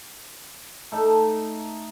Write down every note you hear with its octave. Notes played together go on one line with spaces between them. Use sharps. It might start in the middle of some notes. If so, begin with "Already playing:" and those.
A3 D#4 A5